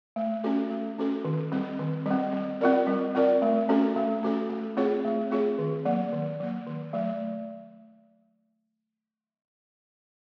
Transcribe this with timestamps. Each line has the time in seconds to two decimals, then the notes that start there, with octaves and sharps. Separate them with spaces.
0.16 A3
0.44 C#4 F#4 A4
0.70 A3
0.98 C#4 F#4 A4
1.25 D#3
1.52 G3 C4
1.79 D#3
2.06 G3
2.11 C4
2.33 G3
2.61 C4 F4 A#4 D5
2.87 G3
3.15 C4 F4 A#4 D5
3.42 A3
3.69 C#4 F#4 A4
3.96 A3
4.23 C#4 F#4 A4
4.49 A3
4.77 C4 F4 G#4 C#5
5.05 A3
5.31 C4 F4 G#4 C#5
5.59 D#3
5.85 F#3 A#3
6.12 D#3
6.40 F#3 A#3
6.67 D#3
6.93 F#3 A3